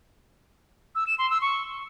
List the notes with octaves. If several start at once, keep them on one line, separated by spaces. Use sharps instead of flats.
E6
E7
C6
E6
C#6